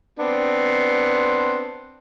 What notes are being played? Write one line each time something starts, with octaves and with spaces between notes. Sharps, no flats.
B3 C4 D4